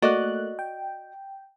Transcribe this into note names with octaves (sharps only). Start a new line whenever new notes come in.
A3 A#3 F#4 D5 D#5 F#6
G5